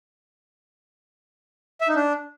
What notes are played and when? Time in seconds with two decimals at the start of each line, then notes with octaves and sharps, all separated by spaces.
1.81 E5
1.88 D#4
1.96 D4